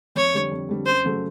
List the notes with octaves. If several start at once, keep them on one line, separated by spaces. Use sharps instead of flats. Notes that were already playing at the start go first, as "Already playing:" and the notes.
F2 C#5
D3 G3 C4
F2
D3 G3 C4
F#2 C5
C#3 F#3 A3